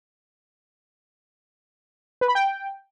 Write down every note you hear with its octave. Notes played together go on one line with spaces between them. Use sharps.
B4
B5
G5